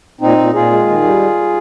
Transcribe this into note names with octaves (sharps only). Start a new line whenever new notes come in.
A#2 C4 D#4
A#2
A#2 F4 G#4
G#3
D#3
G3